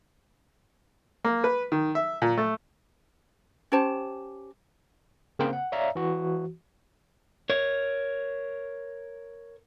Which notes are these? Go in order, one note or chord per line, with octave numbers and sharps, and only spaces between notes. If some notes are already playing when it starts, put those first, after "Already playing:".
A#3
B4
D#3
E5
A#2
A3
C#4 G4 C5 A5
C#3 A#3 C4 A#4 C5 G5
F#5
C#5 D5 E5 F5 A#5
E3 F#4
A#4 C#5